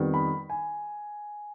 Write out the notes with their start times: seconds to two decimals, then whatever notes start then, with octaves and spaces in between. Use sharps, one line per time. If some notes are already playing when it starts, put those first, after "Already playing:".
Already playing: F2 D#3 G3 B3
0.14 B5
0.50 G#5